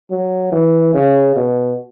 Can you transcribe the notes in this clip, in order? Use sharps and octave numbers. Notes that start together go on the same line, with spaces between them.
F#3
E3
C#3
B2